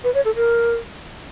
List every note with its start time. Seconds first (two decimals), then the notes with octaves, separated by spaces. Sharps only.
0.04 B4
0.14 C#5
0.25 A4
0.35 A#4